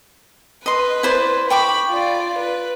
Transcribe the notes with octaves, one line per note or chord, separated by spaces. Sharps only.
B4 D#5 C6
E4 C5 D5
G5 B5 C#6 D6
F4 D5
B4